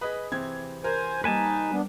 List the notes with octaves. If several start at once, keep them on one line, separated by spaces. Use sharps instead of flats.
G#4 B4 D#5 B5 D#6
C3 E3 C4 G#6
A#4 C5 G#5
G3 A#3 D#4 B4 G#5 A5
G3 B3 D4